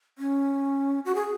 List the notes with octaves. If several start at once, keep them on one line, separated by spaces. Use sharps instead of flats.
C#4
F#4
G#4